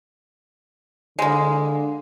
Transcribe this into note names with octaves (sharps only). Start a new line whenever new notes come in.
D3 G#3 A#3